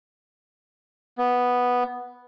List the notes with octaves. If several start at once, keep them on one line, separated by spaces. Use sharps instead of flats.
B3